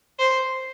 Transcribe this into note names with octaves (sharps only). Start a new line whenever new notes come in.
C5